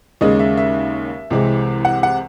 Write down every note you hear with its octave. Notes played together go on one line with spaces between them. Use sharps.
D#2 C#3 G#3 C#4 D#5
E5
E5
C2 C3 E3 G#3 C4
F#5
F#5